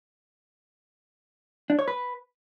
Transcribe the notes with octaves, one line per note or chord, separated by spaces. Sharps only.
D4
C#5
B4